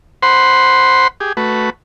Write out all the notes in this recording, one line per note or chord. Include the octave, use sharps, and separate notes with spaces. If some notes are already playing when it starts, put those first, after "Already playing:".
C5 F#5 B5 C6
G4 G#4
A3 F#4 B4